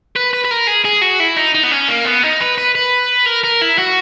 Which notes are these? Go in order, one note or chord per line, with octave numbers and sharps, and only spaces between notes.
B4
B4
B4
A#4
G#4
G#4
F#4
E4
D#4
D#4
B3
C#4
A#3
B3
D#4
B4
B4
B4
A#4
A#4
E4
F#4